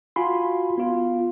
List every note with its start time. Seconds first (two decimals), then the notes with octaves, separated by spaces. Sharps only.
0.16 F4 F#4 G#5 B5 C6
0.78 B3 F4